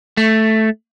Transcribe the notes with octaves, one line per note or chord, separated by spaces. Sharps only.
A3